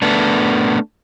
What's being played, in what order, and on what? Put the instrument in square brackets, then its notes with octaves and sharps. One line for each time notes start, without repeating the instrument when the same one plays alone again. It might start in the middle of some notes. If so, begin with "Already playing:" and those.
[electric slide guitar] A3 B3 D4